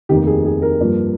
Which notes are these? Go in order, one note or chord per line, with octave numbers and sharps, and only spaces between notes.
F1 D#2 D#3 G4
G#4
G#4
A#4
G2 F3 A#3